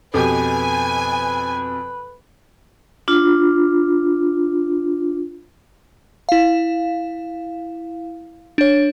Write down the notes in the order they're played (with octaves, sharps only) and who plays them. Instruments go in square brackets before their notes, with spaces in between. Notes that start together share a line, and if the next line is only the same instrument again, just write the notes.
[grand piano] F2 B2 G4 [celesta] A4 D6 [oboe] B4 [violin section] G#5
[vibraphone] D4 F4
[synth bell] E4 F5
D4 C#5